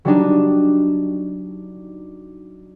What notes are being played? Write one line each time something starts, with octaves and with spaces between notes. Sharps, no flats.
F#3 G3 D4 D#4